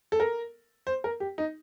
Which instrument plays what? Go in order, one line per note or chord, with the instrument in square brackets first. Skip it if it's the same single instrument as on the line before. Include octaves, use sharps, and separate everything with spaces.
[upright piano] A4
A#4
C5
A#4
G4
D#4